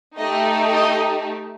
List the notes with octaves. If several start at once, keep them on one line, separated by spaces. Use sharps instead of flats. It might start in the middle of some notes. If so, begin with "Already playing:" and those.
A3 D#4 G4 D#5
D#5